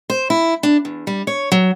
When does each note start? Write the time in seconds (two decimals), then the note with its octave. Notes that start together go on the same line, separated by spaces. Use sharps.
0.10 C5
0.30 E4
0.63 D4
0.85 E2
1.07 G3
1.27 C#5
1.52 F#3